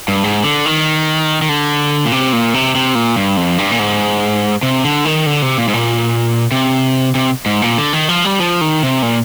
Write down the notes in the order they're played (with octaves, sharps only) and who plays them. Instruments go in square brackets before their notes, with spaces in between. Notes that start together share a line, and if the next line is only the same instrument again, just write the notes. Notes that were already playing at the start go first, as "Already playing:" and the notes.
[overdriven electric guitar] G2
G#2
D3
D#3
D#3
D3
A#2
C3
A#2
C3
C3
A#2
G2
F2
G2
A#2
G#2
C3
D3
D#3
D3
C3
A#2
G#2
A#2
C3
C3
G#2
A#2
D3
D#3
F3
G3
F3
D#3
C3
A#2